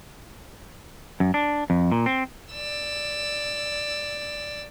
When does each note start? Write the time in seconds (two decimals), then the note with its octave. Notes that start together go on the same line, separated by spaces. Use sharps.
1.20 F#2
1.34 D4
1.70 F2
1.92 A#2
2.06 C4
2.52 D5 E6